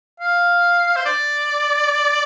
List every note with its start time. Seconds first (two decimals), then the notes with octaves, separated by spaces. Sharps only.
0.20 F5
0.96 C5
1.05 D5